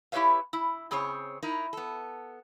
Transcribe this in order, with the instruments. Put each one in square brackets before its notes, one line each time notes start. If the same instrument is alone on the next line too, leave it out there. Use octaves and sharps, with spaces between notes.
[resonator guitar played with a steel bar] E4 G4 B4 C#5 E5 F5
E4
C#3 C4 G#4 C5 C#5
D#4 E4 A#4
B3 A4